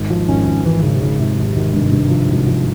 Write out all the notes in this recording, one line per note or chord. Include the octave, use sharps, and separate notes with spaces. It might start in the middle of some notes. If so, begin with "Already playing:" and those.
Already playing: G#1
F3
G#1 C#4
G#1
G#1 E3
G#1 C#3
C3
G#1 C#3
G#1 C3
G#1
G#1
G2
G2
F3
G#1
F3